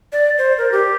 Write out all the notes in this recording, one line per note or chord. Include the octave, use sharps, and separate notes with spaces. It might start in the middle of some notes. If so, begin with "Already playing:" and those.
D5
C5
A#4
G4